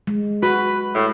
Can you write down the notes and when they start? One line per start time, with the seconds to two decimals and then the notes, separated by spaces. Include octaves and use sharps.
0.07 G#3
0.43 F#4 B4
0.95 A2